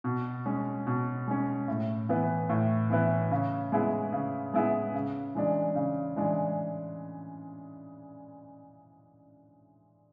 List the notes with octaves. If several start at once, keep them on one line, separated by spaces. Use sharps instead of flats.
B2
G#3 C#4
B2
G#3 C#4
A2
E3 B3 E4 B4
A2
E3 B3 E4 B4
C#3
G#3 B3 E4 G#4
C#3
G#3 B3 E4 G#4
C#3
E3 G#3 D4
C#3
E3 G#3 D4